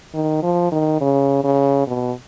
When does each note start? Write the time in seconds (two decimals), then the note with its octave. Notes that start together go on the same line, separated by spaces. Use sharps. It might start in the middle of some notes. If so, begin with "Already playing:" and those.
0.14 D#3
0.43 F3
0.72 D#3
1.01 C#3
1.44 C#3
1.88 B2